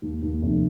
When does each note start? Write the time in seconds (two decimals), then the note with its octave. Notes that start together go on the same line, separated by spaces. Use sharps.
0.02 D#2
0.23 D#2
0.42 F1